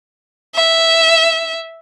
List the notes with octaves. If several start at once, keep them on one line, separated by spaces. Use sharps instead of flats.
E5